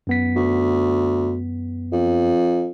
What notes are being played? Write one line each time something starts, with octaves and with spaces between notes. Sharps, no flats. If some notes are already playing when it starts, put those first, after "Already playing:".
F#2 B3 B6
D2
F2